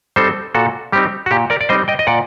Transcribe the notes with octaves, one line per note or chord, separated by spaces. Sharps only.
G3 C4 D#4 A4 C5
A#2 F#4 A4
G3 C4 D#4 G4
F#4
A#2 G4
A#4 D5
D5
G3 C4 D#4 C5 D#5
D#5 G5
D#5
A#2 D5 F#5